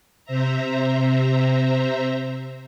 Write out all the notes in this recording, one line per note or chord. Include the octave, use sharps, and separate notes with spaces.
C3 C5 E5 A#5